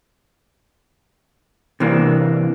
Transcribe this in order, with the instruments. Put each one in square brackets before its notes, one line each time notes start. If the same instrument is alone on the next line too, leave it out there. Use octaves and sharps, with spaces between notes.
[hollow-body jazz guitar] C3 E3 A#3 D4